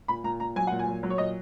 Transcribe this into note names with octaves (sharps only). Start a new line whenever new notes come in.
A#2 B5
A#2 A#5
A#2 A#5
F#3 G#5
A#2 F#5
G#5
F#3
F#3
C#5
A#2 D#5